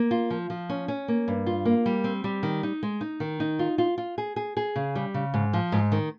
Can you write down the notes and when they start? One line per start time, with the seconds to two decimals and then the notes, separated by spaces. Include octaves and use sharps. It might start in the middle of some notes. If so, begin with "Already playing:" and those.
Already playing: A#3
0.11 F4
0.30 F3
0.50 F3
0.69 C#4
0.88 C#4
1.08 A#3
1.28 G2
1.46 F4
1.65 A#3
1.86 G3
2.04 C4
2.24 G3
2.43 D#3
2.63 D#4
2.83 G#3
3.01 D#4
3.20 D#3
3.40 D#4
3.59 F4
3.78 F4
3.98 F4
4.18 G#4
4.36 G#4
4.57 G#4
4.76 C#3
4.95 G3
5.14 C#3
5.34 G#2
5.53 F3
5.72 G#2
5.92 D#3